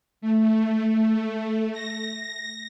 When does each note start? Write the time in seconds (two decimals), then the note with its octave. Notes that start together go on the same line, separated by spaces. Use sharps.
0.21 A3
1.72 A#6